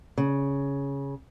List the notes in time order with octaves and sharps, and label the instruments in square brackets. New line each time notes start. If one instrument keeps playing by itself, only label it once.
[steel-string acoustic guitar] C#3